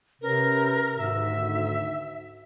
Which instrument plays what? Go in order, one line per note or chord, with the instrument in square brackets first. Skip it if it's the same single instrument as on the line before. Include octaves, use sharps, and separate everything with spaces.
[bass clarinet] C3 [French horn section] C#4 B4 [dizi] A#4
[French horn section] D2 D#3 F#4 [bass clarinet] G#2 [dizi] E5